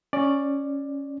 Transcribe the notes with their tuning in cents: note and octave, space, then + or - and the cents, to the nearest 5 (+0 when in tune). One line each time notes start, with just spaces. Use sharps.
C#4 +0 D5 +10